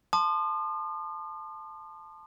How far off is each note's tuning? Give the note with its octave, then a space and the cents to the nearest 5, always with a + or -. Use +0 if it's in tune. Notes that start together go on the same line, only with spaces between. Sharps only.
A5 +0 C6 +0 D#6 -45